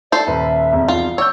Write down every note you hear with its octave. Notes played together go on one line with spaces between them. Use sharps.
A4 C5 D5
D#1 B4 E5
E1 C2 F2
F4
C#5 D5 E6 G6